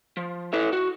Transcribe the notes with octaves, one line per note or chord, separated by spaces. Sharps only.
F3
E4 A4 B4 E5
F#4